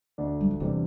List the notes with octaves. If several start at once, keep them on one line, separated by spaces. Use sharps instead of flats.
D2 D3 A3 D4
G3
F3
E2 C3 E3 G3 D4